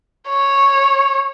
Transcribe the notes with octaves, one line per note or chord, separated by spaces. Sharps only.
C#5